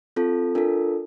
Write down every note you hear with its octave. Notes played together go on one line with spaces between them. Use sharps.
C4 F4 A4
D4 F4 A4 A#4